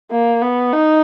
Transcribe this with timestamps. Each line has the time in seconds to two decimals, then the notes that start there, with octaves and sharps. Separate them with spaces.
0.11 A#3
0.42 B3
0.72 D#4